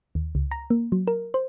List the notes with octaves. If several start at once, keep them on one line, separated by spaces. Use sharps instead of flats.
D#2
C#2
A#5
A#3
F#3
A#4
C5